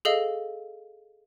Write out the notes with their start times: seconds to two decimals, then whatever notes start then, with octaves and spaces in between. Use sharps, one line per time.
0.05 G#4 A4 D#5 F5